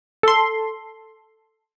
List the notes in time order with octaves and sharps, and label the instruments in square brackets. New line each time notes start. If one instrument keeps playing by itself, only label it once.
[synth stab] A4 C6